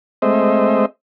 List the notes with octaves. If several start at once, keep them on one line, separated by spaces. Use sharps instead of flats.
G#3 A3 C4 C5 D#5 E5